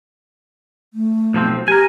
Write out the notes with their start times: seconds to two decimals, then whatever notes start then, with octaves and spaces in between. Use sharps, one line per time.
0.94 A3
1.34 B1 F3 C4
1.68 G4 A#4 G#5